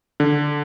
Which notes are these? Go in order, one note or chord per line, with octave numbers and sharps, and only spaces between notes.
D3